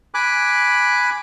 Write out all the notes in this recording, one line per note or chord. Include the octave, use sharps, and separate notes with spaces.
G#5 B5 D6 F#6